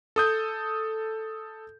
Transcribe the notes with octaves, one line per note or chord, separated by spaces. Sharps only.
A4 D#6 G6